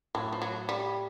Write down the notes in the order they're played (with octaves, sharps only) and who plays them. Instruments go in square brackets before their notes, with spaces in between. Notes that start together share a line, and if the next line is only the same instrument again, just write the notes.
[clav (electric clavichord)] A2 [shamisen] F#3
[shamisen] F3
F#3
G3